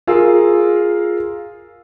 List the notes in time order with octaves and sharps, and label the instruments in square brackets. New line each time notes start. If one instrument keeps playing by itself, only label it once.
[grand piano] F4 G#4 A#4 F5 E6